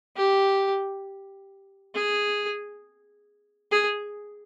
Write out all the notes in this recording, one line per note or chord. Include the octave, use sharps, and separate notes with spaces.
G4
G#4
G#4